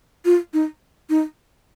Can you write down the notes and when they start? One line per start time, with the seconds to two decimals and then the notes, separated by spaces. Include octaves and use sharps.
0.25 F4
0.53 D#4
1.09 D#4